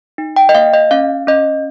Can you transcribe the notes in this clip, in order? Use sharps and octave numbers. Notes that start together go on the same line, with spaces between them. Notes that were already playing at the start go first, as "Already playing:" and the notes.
D#4
G5
D#5
A#3 F5
D#5
C#4 F5
C#4 D#5